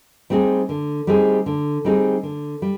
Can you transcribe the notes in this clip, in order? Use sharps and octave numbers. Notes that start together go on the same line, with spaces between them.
G3 C4 D#4 G#4
D3
G3 C4 D#4 G#4
D3
G3 C4 D#4 G#4
D3
G3